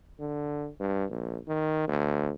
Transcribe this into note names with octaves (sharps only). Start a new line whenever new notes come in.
D3
G2
A#1
D#3
D2